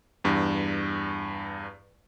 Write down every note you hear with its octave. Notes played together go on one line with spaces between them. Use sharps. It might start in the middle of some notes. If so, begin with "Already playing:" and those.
E2 G2